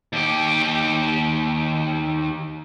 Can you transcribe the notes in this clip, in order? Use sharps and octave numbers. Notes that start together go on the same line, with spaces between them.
D#2 G4